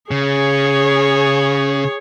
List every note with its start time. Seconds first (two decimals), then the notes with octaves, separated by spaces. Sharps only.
0.11 C#3 G#4 C#5